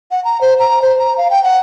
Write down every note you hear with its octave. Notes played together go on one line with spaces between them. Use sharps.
F#5
A#5
C5
A#5
C5
A#5
F5
G5
F#5